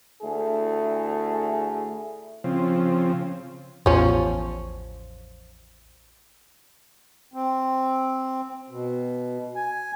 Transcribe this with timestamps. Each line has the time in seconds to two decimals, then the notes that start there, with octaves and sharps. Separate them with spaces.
0.22 D2 A3 E4 G#4
2.44 C#3 F3 C4
3.86 A1 E2 F3 B3 C#4
7.34 C4
8.70 B2
9.56 G#5